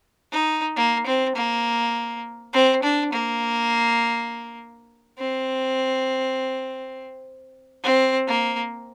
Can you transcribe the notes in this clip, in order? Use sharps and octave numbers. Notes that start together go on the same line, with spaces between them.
D#4
A#3
C4
A#3
C4
D4
A#3
C4
C4
A#3